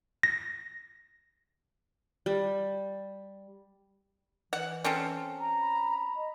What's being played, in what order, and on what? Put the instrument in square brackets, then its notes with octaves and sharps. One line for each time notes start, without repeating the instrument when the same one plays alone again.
[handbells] A#6
[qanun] G3
[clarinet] E3 [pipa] F#5
[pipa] C4 C#4 A4
[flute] A#5
[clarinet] B5
[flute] D#5